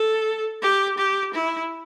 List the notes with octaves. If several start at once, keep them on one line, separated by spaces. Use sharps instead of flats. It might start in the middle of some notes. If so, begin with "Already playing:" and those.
Already playing: A4
G4
G4
E4